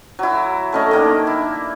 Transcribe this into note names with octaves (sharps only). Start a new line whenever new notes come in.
F#3 E4
A3 C#4 D#5
D#3 A#3 D4
E4